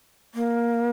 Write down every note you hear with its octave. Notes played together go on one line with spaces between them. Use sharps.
A#3